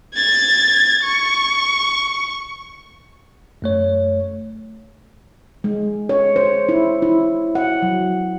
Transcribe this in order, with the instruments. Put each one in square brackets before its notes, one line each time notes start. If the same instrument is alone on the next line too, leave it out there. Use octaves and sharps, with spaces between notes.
[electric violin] G#6 A6
C#6
[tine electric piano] F#2 A3 C#5
[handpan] G#3
C#5
C5
E4
E4
F#5
F#3